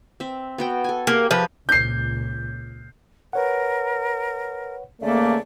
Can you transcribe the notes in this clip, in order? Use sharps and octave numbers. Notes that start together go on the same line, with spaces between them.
C4 E5
B3 F#4 G5
A4 G#5
A#3 G4 G#4 A#4
F3 B4
C#2 A#2 G6 C7
A#4 B4 C#5 F#5
E2 C#3 A3 A#3 D5